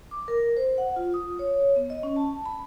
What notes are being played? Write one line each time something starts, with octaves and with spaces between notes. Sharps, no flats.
D6
A#4
C5
F#5
F4
D#6
C#5
B3
D#5
C#4
A5
B5